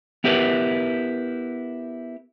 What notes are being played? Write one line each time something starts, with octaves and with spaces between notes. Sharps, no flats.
B3 E4 G4 A#4 B4